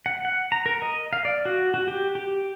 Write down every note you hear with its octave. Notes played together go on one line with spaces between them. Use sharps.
F#5
F#5
A#5
A#4
D#5
F5
D5
F#4
F#4
G4
G4